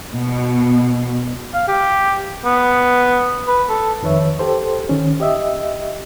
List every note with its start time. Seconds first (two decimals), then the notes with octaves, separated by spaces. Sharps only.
0.12 B2
1.54 F5
1.68 G4
2.45 B3
3.48 B4
3.69 A4
4.03 F2 D#3 B4 C#5 E5
4.39 G4 A4 C5
4.89 D#3 C#4
5.20 G4 D#5 E5